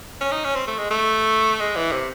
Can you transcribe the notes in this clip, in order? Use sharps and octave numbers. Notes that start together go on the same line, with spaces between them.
C#4
D#4
C#4
C4
A3
G#3
A3
G#3
E3
C3